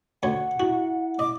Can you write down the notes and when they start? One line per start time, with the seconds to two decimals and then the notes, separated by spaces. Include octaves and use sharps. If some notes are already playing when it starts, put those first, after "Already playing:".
0.23 D2 C#5 F#5
0.60 E4 F#4
1.19 D#5 D6